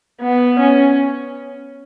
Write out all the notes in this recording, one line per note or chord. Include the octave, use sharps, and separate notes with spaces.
B3
C#4